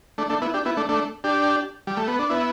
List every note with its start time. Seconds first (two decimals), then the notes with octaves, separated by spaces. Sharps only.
0.18 A3 D4
0.30 A3 D4
0.42 B3 E4
0.54 D4 G4
0.65 B3 E4
0.77 A3 D4
0.89 A3 D4
1.24 D4 G4
1.87 G3
1.97 A3
2.08 B3
2.19 D4
2.30 B3 E4